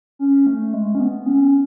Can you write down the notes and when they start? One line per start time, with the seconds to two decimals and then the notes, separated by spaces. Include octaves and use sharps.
0.19 C#4
0.46 A3
0.74 G#3
0.95 C#4
1.00 B3
1.26 C#4